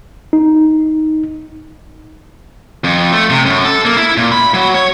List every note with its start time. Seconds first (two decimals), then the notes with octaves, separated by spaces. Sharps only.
0.33 D#4
2.84 F2
3.12 A3
3.30 C3
3.46 F#2
3.65 A4
3.85 A#3
3.97 E4
4.17 A#2
4.32 B5
4.54 F#3
4.75 C#5